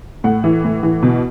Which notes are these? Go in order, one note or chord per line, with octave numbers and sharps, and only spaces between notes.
A2 F#5
E3
A2
E3
B2